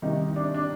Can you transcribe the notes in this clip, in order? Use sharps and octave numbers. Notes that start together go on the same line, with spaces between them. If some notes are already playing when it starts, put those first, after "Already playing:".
C2 C3 D#3 G3 D#4
D4
D4